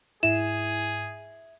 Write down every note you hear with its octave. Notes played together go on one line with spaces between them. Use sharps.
G#2 E4 G#4 E5 E7